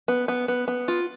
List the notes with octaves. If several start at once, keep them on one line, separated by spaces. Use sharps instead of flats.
B3
B3
B3
B3
F4